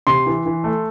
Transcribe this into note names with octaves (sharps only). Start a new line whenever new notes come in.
C3 C6
E3
E3
A3